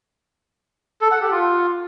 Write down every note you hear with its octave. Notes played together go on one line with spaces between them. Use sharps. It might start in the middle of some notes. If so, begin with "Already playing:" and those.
A4
F#5
G4
F4